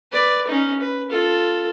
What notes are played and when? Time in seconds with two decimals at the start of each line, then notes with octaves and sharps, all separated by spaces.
0.12 B4 D5
0.47 C#4 D#4
0.81 B4
1.10 F4 A4